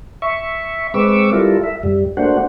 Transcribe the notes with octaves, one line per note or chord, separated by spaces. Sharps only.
E5 C#6
G#3 C4 B4 C#6 D6 E6
G3 E4 F4 A4 A#4
E5
F#2 G3
A3 A#3 D4 F#4 C5 F#5